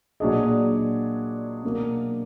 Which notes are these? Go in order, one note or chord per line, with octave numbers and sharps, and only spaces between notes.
A#2 F#3 D4 G#4 D#5
B2 F#3 A#3 D4